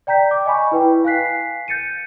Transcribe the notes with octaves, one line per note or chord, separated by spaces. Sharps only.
D5 G5 A#5 G6 B6
D6
D#5 G#5 B5 C#6
E4 B4 G5
F5 G#5 F#6 B6 C7
G6 A6 C#7 D#7